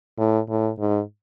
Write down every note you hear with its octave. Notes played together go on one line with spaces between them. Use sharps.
A2
A2
G#2